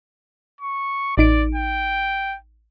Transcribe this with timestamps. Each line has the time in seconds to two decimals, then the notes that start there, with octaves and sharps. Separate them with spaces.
0.61 C#6
1.18 A1 D#4 D5 D7
1.55 G5